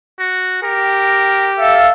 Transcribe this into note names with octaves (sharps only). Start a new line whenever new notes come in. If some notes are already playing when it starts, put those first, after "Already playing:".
F#4
G4 A#4
A4 E5 F5